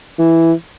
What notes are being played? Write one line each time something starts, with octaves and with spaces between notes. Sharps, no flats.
E3